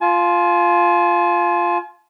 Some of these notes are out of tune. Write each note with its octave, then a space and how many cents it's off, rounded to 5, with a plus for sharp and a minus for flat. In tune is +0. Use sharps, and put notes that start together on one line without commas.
F4 +0 G#5 +45